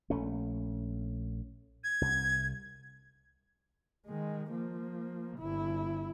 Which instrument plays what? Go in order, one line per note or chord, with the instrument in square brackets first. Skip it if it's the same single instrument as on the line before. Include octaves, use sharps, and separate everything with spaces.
[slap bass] A#1 A3 C#4
[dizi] G#6
[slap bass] C2
[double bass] D#3 G#3
F3 A#3
G1 E4